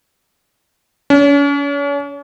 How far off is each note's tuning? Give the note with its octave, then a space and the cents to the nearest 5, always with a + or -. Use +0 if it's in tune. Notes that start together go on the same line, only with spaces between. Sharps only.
C#4 +40